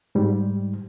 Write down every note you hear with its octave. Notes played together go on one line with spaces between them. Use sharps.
G#2 G3